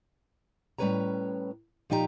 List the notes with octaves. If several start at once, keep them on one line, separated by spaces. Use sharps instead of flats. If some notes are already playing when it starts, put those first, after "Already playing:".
A2 G3 C#4 B4 C#5 A#5
A#2 F3 D#4 G4 B4 A#5